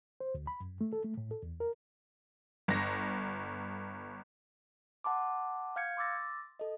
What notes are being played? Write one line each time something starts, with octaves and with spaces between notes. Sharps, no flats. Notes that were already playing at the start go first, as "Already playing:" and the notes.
C5
D2
B5
F#2
A3
A4
A3
A2
A4
E2
A#4
G1 A#6
F#5 A5 C6 D6
F5 F6 G6 G#6 C#7
C6 D6 E6 A6 A#6
A4 D#5